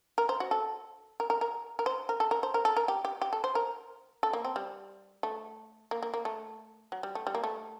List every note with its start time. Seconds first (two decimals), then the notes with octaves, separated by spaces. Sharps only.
0.18 A#4
0.29 C5
0.40 F#4
0.51 A4
1.20 A#4
1.30 A#4
1.41 A#4
1.79 A#4
1.86 C5
2.09 A#4
2.20 A4
2.31 A#4
2.43 C5
2.54 A#4
2.65 A4
2.77 A#4
2.88 G4
3.05 G4
3.22 G4
3.33 A4
3.44 C5
3.55 A#4
4.23 A4
4.33 A#3
4.45 C4
4.56 G3
5.23 A3
5.91 A#3
6.03 A#3
6.14 A#3
6.25 A3
6.92 F#3
7.03 G3
7.15 A3
7.27 G3
7.35 A#3
7.44 A3